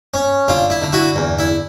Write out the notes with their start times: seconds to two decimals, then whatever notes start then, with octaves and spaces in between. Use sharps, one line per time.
0.14 C#4
0.48 D3 F4
0.70 E4
0.82 D3
0.92 E4 F#4
1.16 E2
1.39 E4